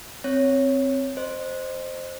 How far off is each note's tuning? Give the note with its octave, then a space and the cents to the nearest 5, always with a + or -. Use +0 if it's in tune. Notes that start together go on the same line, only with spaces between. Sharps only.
C4 +0 C#5 +0
C5 +0 D#5 -25